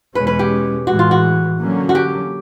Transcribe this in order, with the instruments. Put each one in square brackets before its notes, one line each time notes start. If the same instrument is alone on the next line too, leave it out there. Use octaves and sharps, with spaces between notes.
[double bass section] E2 B2 G#3 C#4 [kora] B4
[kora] B4
G4
[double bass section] A2 E3 G#3 [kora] F#4
[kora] F4
F#4
[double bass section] D3 F#3 A#3 C#4
[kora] F#4
G4